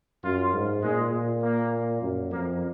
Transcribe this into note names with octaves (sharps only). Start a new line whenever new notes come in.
F#2 F4
G#2
A#2 G#3
A#2
A#3
F#2
F2 A#3